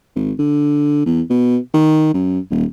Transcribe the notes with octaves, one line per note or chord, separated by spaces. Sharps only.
G#1
D3
E2
B2
D#3
F#2
D#1